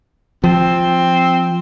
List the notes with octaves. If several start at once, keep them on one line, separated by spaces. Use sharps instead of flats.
F3 C4